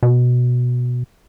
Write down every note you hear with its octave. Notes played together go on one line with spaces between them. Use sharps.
B2